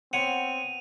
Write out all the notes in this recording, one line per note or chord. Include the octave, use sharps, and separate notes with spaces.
B3 C4 C#5 F#5 G#5 C6 D#7 F7